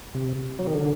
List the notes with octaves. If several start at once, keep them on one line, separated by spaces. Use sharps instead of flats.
C3
F#3
D#3
D3